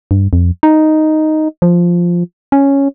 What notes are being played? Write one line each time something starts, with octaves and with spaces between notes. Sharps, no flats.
G2
F2
D#4
F3
C#4